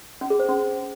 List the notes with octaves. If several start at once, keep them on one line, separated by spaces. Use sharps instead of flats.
C#4
G#4
C5
C#4